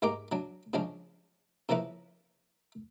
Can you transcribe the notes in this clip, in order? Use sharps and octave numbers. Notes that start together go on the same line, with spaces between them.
G#2 G#3 A#3 G4 A#4 D6
F#3 D4
C#3 F3 G#3 C#4 D4
C#3 F3 A#3 E4 B4